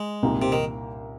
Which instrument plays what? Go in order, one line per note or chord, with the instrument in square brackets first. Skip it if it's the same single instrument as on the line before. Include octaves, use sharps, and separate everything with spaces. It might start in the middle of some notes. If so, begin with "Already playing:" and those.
Already playing: [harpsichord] G#3
[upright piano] C2 A#2 A#3 D#4 A#4
[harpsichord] C3
D#3